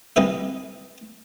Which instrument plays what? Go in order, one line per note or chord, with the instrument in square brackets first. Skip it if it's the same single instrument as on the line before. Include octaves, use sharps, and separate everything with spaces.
[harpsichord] C2 E3 D#4 B4 E5